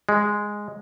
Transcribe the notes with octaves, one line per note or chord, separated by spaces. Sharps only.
G#3